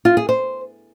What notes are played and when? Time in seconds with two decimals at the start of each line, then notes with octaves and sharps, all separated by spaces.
0.05 F4
0.17 G#4
0.29 C5